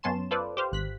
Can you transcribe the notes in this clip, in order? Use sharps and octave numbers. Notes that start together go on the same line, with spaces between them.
F#2 B3 C#4 A5 C6 E7
F4 A4 B4 C5 D5
G4 C5 F5
G#1 F#6 B6